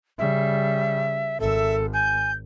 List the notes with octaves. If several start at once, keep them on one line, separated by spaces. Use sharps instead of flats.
C#3 G3 E5
G#1 A4 E5
G#5 G6